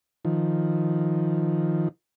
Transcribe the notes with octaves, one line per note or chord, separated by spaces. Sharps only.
D#3 F3